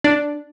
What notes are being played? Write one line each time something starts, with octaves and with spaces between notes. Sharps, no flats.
D4